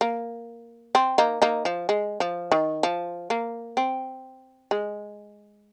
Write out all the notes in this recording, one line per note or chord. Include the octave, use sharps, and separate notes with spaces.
A#3
C4
A#3 D#4
A#3 D#4
F3
G#3
F3
D#3
F3
A#3
C4
G#3